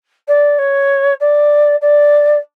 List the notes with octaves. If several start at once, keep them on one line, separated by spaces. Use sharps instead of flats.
D5
C#5
D5
D5